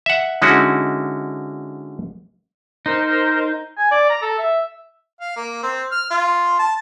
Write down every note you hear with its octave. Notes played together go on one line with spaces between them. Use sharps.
E5 F#5
D3 G#3 C#4 D#4 E4 F#4
D#4 A#4 C5
G#5
D5
A#5
A4
E5
F5
A#3
C4
F6
F4
A5